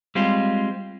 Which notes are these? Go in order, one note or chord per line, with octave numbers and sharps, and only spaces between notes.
G3 G#3 C4 F4